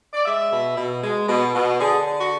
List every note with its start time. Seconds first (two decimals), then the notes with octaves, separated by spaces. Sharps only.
0.13 D5
0.25 G#3 E5
0.51 B2
0.77 B2
1.03 G#3
1.29 B2
1.54 B2
1.80 D3 G#4
2.07 D3
2.20 F#4